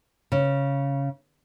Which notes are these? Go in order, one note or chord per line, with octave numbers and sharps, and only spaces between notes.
C#3